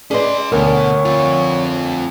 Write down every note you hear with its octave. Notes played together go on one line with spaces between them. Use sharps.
C#4 G#4 B4 D5 D#5 C6
D2 B2 A#4 C#5
C4 F4